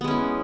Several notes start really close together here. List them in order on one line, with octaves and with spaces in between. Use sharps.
B3 G#3 C#4 E4